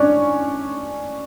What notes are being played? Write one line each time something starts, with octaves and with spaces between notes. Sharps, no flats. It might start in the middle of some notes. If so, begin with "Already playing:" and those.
Already playing: C#4 D4